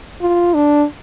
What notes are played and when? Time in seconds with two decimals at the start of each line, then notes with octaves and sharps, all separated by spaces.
0.21 F4
0.54 D4